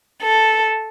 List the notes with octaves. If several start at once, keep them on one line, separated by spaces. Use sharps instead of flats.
A4